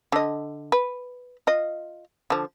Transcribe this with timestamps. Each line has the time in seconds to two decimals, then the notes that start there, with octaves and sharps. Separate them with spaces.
0.12 D3 D#5
0.72 B4
1.47 F4 D#5
2.30 D3 F3